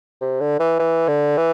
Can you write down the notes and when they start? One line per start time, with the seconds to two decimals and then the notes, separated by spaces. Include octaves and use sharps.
0.21 C3
0.40 D3
0.60 E3
0.79 E3
1.08 D3
1.37 E3